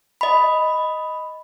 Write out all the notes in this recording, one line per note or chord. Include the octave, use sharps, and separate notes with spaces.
D#5 B5